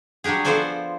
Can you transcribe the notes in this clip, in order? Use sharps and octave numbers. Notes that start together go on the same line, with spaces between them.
F#3 G3 D4 G4 G#4
F3 B3 A4 C5 D5 G#5